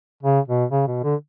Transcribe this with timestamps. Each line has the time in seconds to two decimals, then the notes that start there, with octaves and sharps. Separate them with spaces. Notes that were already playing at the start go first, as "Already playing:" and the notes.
0.23 C#3
0.48 B2
0.71 C#3
0.87 B2
1.03 D3